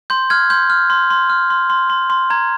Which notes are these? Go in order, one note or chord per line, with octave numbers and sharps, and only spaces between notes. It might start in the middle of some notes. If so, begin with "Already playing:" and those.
C6 G6
F6 G#6
C6 G6
F6
C6
C6
F6
C6
C6
C6
C6
A#5 G#6